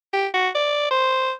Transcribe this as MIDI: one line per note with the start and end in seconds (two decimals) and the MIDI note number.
0.13 0.27 67
0.34 0.49 66
0.55 0.87 74
0.91 1.32 72